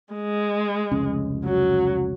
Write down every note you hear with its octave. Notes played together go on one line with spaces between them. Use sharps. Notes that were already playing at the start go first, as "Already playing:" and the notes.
G#3
F1 C#2 C#4
F#3